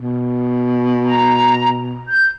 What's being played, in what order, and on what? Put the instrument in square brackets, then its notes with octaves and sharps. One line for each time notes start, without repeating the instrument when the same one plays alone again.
[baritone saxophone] B2
[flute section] A#5
G6